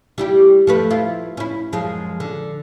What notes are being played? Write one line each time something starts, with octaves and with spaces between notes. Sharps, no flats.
G3 E4 G4
F3 A3 B4
E4 F4
C#4 E4
F#2 F3 G#3
D3